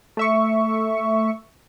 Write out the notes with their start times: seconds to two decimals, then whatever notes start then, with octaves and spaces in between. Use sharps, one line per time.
0.17 A3 E5 C#6